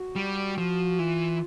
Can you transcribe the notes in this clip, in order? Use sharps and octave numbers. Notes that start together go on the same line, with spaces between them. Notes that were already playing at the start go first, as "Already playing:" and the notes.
Already playing: F#4
G3
F3
E3 F4